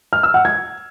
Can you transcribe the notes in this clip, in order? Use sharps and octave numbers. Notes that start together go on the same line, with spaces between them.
F6
E6
F#5
G#6